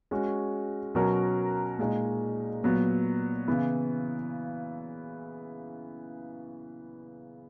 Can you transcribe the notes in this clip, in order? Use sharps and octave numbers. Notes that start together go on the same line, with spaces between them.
G#3 C#4 F#4
B2 F#3 C#4 F#4 A#4
A#2 G#3 D#4
A#2 F#3 B3
C#3 E3 B3 E4